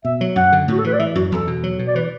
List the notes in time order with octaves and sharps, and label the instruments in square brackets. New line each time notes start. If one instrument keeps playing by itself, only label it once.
[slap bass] B2 [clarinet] E5
[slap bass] F#3
[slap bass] F#2 [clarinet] F#5
[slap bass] D3
[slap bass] A2 [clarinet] F#4
[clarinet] A4
[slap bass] E3 [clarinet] B4
[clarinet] D5
[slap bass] E3 [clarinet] E5
[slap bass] F#2 [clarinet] F#4
[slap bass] E2 [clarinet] A4
[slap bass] B2
F#3
B2
[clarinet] D5
[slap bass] E3 [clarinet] B4